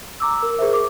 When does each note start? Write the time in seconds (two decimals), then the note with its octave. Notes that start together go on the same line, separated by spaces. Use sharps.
0.20 A#5 D6 E6
0.43 A#4
0.59 G#4 A#4 C5 E5
0.73 D6